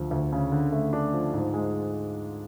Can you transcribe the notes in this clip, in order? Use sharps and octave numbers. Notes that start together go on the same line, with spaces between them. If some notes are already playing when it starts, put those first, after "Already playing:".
Already playing: D2 F3
D2
C#3
D3
A3
D4
F3
G#2
G#3